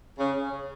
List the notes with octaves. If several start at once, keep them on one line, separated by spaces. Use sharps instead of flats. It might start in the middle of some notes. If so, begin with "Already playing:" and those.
C#3